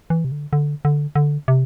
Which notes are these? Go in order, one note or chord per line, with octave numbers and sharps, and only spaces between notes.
E3
C3
D3
D3
D3
D3
C3